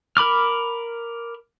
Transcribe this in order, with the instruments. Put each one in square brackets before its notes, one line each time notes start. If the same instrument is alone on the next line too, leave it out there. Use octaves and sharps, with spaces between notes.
[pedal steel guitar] A#4 B5 D6 F6